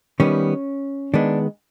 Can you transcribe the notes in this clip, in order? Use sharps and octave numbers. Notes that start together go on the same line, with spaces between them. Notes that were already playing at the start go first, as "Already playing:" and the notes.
D#3 G3 B3 C#4
D#3 G#3 B3 D4